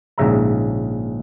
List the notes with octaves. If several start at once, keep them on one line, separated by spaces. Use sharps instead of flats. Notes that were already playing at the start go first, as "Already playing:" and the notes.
A#1 G#2 C#3 E5 A#5